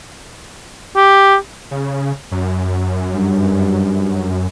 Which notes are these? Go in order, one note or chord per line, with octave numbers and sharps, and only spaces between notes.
G4
C#3
F#2
G2